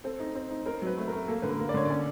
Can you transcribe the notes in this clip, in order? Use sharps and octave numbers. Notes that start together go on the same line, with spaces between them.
C4 A4
D#4
C4
D#4
C4 A#4
F#3 B4
A3
A#4
A3
A#3 A4
D3 B4
A#4
A#3
D5
D3 C#5
C#4 D5